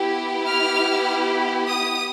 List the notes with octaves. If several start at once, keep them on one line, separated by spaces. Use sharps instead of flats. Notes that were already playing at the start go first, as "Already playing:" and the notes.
Already playing: B3 E4 G4
F6
D#6